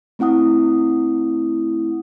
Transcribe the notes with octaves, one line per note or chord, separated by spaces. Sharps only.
A3 C4 E4 F#5 D#6